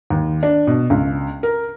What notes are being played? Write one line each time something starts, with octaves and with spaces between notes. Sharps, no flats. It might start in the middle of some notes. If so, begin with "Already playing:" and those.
D#2
D4
B2
C#2
A#4